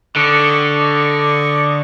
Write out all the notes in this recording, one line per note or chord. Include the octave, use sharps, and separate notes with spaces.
D3 G4 D#5 C#6
D5 D#5 C#6